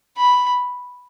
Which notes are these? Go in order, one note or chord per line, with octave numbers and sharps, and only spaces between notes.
B5